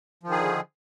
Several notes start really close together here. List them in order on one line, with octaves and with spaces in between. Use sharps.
F3 D#3 G#4 D3